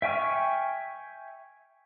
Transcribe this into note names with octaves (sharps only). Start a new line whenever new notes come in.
E5 G5 G#5 C#6 F6